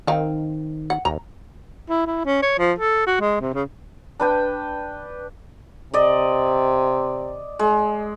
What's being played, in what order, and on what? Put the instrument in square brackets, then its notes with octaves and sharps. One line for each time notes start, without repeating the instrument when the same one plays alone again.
[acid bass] D#3 [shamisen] C4 D#4 F5
[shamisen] F#5
[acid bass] D#2 [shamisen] A#5
[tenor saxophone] E4
E4
C#4
C#5
F3
A4
F#4
G#3
C3
C#3
[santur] D4 B4 G5
[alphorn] C3 [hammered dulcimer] D5 D#5
[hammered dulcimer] G#3